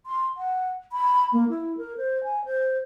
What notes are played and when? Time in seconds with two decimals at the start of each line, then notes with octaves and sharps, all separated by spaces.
0.06 C6
0.37 F#5
0.92 B5
1.33 A#3
1.49 E4
1.77 A#4
1.97 C5
2.24 G#5
2.45 C5